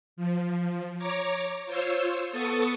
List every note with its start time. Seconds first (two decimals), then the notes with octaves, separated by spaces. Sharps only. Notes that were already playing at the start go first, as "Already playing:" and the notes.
0.16 F3
0.98 C#5 A#5 D6
1.66 F4 C5 C#5 E6
2.31 B3 A4 C#6 D#6 A6